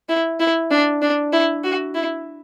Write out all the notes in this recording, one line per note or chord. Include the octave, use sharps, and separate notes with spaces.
E4
E4
D4
D4
E4
F#4
E4